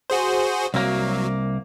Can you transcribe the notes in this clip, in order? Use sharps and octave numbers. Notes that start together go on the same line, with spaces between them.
F#4 G#4 C5
C2 F#3 A#3